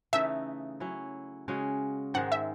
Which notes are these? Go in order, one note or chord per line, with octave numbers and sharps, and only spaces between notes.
C#3 E3 A3 D#4 E5
F#3 C#4 E4
C#3 G#3 C#4 F#4
G#2 D#3 G#3 F#5
E5